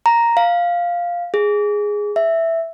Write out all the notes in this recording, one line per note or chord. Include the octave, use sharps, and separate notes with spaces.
A#5
F5
G#4
E5